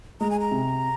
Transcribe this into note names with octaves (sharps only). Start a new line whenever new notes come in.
G#3 A#5
G#5
A#5
C3